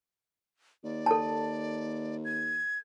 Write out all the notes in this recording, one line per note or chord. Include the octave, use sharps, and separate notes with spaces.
D#2 D5
A4 A5
G#6